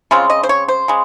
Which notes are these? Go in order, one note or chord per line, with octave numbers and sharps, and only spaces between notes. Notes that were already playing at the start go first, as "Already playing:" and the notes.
C#3 G#3 C4 F4
D#5
C5
C#5
C5
C#3 G#3